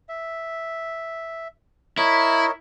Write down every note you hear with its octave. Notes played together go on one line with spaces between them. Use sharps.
E5
E4 A#4 C#5 D#5